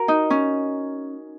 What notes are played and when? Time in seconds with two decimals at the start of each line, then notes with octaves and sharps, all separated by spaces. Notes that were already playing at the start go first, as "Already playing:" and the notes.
Already playing: F#4 A#4
0.08 D#4
0.30 C#4